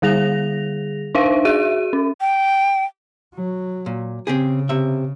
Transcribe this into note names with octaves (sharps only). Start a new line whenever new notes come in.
D3 G3 G#4 A#6 F7
D4 D#4 C5 E5 F5
F#4 G#4 E5 D#7
C#4
G5
F#3
A#2
C#3 C4 G4 G#4
C3 E5